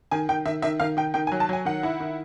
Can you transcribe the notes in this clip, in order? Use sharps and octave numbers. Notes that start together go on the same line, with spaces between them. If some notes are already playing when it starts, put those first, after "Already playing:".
D#3 G#5
D#3 G5
D#3 E5
D#3 E5
D#3 F5
D#3 G5
D#3 G5
G#5
F#3
A5
F#3 G#5
D#3 F#5
E4
D#3